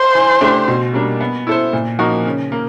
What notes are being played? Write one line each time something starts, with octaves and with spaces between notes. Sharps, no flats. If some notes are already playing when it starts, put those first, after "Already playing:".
Already playing: C5
E3
A3 D4 G4
B2
G3 A#3 D4
B3
E4 A4 C5
A#2
F3 A#3 D#4 F#4
C#3
A#3